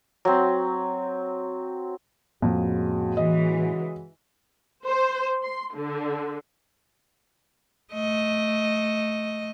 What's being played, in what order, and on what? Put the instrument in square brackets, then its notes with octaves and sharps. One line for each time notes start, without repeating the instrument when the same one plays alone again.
[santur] F#3 C4
[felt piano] F2 [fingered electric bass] A2 A#3 [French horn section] C#3 G#3 F#4
[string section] E3 [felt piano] D#5
[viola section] C5
C6
D3
[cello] A3 D#5